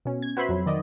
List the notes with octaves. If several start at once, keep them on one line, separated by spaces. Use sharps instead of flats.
B2 C#4
G#6
F#4 B4 C5 E5 B5 C6
F2 F#3
D#3 D5 D#5